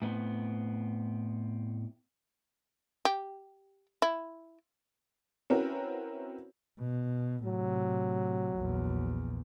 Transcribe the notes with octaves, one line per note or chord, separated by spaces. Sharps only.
A2 B3 C4
G4
E4
C4 C#4 E4 F#4 A#4 B4
B2
A2 C3 F#3
A#1 E2